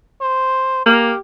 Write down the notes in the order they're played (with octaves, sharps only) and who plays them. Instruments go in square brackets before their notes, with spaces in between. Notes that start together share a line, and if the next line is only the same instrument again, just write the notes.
[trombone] C5
[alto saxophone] A#3 [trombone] G4